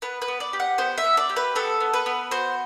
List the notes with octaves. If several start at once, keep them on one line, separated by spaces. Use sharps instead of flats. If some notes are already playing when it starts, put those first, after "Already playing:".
B3 B4
B4
B3
D5
G4
F#5
B3 C5
E5
B3
D5
G4
B4
B3 A4
B3
B4
B3
F#4 C5